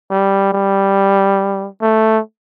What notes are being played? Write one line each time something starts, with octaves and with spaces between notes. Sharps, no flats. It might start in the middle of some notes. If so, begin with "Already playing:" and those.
G3
G3
A3